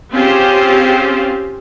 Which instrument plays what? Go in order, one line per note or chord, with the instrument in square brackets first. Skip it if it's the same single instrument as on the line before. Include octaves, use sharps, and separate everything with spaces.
[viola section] C4 C#4 F4 G4 G#4 C5